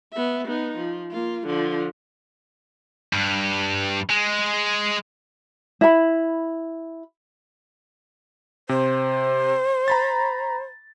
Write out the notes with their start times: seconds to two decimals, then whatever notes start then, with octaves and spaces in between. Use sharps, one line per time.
0.13 B3 E5
0.47 B3 D#4
0.77 F3
1.11 A#3 F4
1.47 D3 F3
3.13 G2
4.10 G#3
5.81 E4 B5
8.69 C3 C5
9.88 A#5 B5 A6